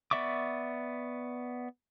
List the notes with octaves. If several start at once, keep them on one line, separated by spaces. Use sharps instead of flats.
B3 D5 E5 C#6 D6